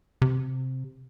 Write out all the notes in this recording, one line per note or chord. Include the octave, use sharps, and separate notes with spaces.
C3